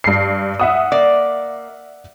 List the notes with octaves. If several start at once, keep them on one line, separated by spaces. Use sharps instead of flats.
G2 C7
E5 F#5 D#6
A#3 D5